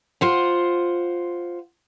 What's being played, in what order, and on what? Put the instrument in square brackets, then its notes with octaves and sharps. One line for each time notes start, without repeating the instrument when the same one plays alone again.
[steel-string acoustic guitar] F4 C5 F#5